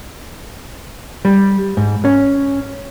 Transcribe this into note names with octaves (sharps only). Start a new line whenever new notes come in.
G3
G#2
C#4